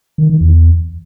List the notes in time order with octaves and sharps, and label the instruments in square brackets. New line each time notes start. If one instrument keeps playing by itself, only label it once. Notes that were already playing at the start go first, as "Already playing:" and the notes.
[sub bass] D#3
D#3
E2